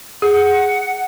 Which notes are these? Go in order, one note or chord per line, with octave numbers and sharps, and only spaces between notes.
G#4 F#5